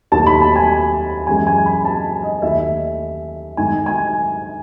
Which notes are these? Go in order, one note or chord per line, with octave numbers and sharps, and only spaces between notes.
D#2 D#3 A3 A5
B5
A5
G#5
F#2 E3 G#3 G#5
G#5
B5
A5
D#5
D#2 D#3 A3 E5
G#2 D#3 A3 G#5
G#5